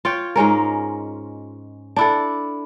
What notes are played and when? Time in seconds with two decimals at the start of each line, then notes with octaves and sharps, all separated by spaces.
0.05 F4 C#5 G5
0.36 G#2 G#3 C#4 A#4
1.96 D4 E4 A4